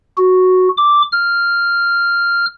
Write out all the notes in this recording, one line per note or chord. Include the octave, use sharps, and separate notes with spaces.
F#4
D6
F6